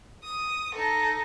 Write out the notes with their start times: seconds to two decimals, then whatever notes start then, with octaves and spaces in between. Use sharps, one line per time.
0.24 D#6
0.75 D#4 A4